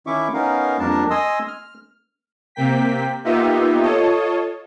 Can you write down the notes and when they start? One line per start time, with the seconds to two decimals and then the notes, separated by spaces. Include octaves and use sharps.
0.07 D#3 C#4 E4 E5 C#6 D6
0.33 B3 C#4 D#4 A#4 F5
0.79 F2 G3 A#3 D4 A#4 A5
1.10 D#5 G#5 C6 D#6 E6
1.48 F6
2.55 C3 A#3 G5 B6
3.24 A#3 B3 D#4 F4 G4 E5
3.81 F4 A4 C#5 D#5